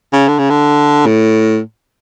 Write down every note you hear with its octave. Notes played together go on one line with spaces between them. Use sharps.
C#3
D3
C#3
D3
A2